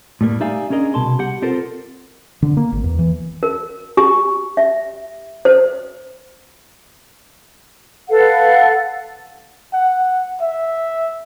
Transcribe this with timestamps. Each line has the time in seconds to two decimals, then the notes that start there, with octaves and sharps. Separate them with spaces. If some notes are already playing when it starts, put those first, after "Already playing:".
0.21 A2 G3 A#3
0.40 D#4 G4 D5 E5 F5 G#5
0.70 C#4 D4 G#4 A#4 D#5
0.94 C2 B2 A5 C6
1.19 G4 F#5
1.42 C4 F4 A4 A#4 C5
2.42 D3
2.57 A#3
2.72 G#1
2.84 E2
2.99 E3
3.43 A#4
3.97 G4
4.57 E5
5.45 C5
8.09 A4 B4 F5 F#5
9.73 F#5
10.41 E5